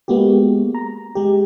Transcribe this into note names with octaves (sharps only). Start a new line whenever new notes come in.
G#3 A#3 B3 F#4 G4
A#5
G#3 G4